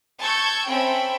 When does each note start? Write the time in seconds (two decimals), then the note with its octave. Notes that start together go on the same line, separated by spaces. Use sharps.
0.20 A5 C#6 E6 G6 G#6
0.68 C4 C#4 A4 E5 G5 B5